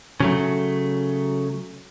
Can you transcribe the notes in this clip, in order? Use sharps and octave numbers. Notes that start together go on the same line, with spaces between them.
C#3 F#3 A3